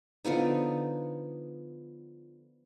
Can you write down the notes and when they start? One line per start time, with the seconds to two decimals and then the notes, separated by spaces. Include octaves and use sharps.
0.25 D3 F3 B3 D#4